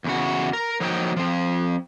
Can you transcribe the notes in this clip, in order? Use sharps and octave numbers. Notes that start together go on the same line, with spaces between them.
E2 C#3 F#4
A#4
F3 F#3 A#3 D#4 E5 G5
F3 C4